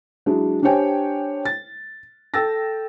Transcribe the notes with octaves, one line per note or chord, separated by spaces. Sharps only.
F#3 G#3 D4 E4
D4 G4 C5 C#5 G5 G#5
A6
A4 G5 E6 A6 A#6